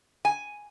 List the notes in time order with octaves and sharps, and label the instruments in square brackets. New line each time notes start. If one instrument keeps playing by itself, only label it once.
[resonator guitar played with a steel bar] G#5